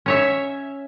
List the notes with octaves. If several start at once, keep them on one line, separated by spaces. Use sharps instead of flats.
C#4 C#5 E5